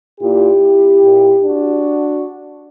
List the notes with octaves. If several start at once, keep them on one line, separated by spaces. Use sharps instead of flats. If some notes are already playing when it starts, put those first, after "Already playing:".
A#2 E4 G4
A#2
D4 F#4